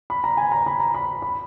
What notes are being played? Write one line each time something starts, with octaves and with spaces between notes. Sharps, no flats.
B5
A#5
G#5
A#5
B5
A#5
B5
B5